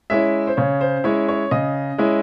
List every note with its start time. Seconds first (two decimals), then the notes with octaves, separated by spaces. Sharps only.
0.10 G#3 C#4 E4 E5
0.47 C5
0.57 C#3 C#5
0.81 C5
1.04 G#3 C#4 E4 C#5
1.28 C#5
1.51 C#3 D#5
1.98 G#3 C#4 E4